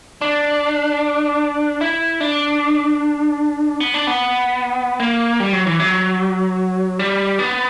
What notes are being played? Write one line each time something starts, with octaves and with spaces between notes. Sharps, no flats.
D4
E4
D4
B3
D4
B3
A#3
G3
F#3
E3
F#3
G3
B3